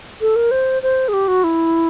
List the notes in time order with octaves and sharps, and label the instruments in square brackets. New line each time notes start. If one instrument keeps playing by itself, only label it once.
[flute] A4
A#4
C5
C5
G#4
G4
F#4
E4